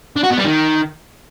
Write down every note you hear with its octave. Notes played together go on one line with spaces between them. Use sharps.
D4
F#4
B3
G3
D#3